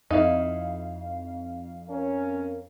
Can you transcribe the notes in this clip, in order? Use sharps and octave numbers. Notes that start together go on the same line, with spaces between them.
F2 D#4 E4 F5
C#4 A#4